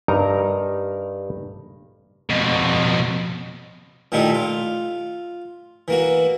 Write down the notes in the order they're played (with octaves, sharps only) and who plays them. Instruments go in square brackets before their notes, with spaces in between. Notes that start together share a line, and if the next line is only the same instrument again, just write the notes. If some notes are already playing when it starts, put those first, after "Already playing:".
[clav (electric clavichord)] G2 D#4 A#4 A#5
[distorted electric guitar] F2 B2
[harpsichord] A#2 D#3 A3 D#4 E4 G4
F4
E3 A#3 F#4